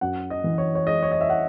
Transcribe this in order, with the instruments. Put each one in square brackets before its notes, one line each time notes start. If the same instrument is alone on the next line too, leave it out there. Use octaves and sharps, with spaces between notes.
[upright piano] F#2 [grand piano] F#5
[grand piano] D#5
[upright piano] E3
[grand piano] C#5
C#5
[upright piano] G#3 [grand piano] D#5
[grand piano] C#5
D#5
E5
F#5